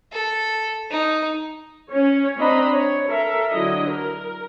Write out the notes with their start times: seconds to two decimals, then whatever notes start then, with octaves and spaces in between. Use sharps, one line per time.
0.12 A4
0.90 D#4
1.89 C#4 C#5
2.39 C4 D4 D#5 A#5 B5
2.72 C#5
3.07 A4 A#4 E5
3.52 D3 F#3 E4 D#5
3.90 A#4